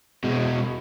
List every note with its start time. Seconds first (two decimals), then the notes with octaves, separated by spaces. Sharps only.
0.24 B2 G#3